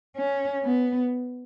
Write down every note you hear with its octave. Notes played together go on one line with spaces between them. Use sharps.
C#4
B3